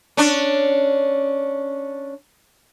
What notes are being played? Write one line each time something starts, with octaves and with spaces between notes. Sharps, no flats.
C#4 D4